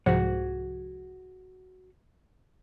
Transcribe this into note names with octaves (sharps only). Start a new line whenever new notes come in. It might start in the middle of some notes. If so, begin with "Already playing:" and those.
C2 G#2 F3 F#4 G#4 F#5